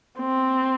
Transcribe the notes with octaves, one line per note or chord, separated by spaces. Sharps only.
C4